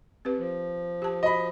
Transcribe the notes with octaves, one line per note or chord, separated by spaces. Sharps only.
C4 G4 B4
F3
G4 A5
F#4 D#5 B5